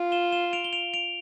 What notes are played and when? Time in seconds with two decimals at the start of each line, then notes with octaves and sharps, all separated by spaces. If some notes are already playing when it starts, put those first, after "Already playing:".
Already playing: F4
0.12 E7 G7
0.32 E7 G7
0.53 D7 F7
0.64 G7
0.73 D7 F7
0.94 D7 F7